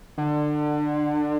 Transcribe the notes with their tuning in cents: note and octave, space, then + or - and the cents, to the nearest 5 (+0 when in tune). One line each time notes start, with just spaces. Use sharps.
D3 +25